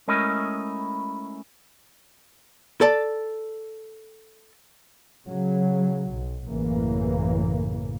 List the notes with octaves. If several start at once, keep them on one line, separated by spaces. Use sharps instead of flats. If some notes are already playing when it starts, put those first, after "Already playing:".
G#3 A3 C#4 E4 A#4 D#5
A4 D5 A5
C#3 F#3
B1
A1 F#2 C#3 E3 A#3